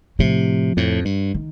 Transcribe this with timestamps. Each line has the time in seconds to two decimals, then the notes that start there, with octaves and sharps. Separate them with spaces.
0.19 A2 C3 F3
0.77 F2 A2
1.05 G2
1.34 D#3